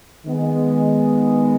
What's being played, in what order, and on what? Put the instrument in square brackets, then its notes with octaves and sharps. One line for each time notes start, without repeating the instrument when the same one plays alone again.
[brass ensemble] D#3 G#3 B3